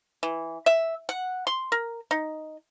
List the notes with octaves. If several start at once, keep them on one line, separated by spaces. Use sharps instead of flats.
E3
E5
F#5
C6
A#4
D#4